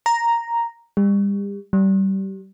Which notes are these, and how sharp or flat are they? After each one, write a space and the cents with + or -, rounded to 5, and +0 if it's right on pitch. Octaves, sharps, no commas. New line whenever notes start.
A#5 +0
G3 +35
G3 -25